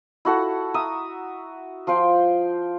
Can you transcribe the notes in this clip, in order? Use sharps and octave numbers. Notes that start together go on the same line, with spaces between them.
E4 F#4 A4 F#5
E5 A#5 D#6
F3 F4 C5 G5